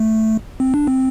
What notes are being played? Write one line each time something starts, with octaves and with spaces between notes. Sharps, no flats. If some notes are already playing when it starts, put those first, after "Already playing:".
Already playing: A3
C4
D4
C4